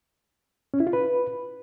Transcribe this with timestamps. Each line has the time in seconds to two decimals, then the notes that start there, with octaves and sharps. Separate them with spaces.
0.74 C#4
0.80 E4
0.87 F4
0.93 B4